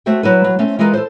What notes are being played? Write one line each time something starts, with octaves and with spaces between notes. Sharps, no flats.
A3 F#4 C5 E5 G5
F#3 E4 B4
F#3
A3 C4 C#4
E3 G#3 F4 A#4 B4
A4 B4 C5